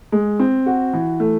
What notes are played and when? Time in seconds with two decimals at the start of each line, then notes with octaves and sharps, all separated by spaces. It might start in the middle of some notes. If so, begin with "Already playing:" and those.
0.12 G#3
0.39 C4
0.66 F#4
0.93 E3
1.20 A3